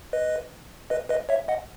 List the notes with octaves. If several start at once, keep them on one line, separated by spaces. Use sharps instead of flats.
B4 D#5
B4 D#5
B4 D#5
C#5 E5
D#5 F#5